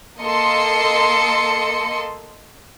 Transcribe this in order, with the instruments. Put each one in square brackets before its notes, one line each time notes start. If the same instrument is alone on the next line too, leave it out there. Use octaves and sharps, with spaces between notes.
[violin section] A#3 A4 D#5 C6 C#7